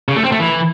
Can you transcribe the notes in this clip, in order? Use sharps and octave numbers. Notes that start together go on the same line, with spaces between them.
C#3
A3
C4
A3
E3